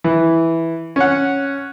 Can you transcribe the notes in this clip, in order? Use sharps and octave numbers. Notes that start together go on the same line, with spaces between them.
E3
C#4 F#5